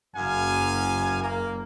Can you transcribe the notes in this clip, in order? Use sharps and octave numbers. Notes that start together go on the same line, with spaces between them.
F#1 F#2 F5 G#5
A#3